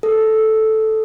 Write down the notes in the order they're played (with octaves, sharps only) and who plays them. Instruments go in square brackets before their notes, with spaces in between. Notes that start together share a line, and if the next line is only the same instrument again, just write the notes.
[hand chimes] A4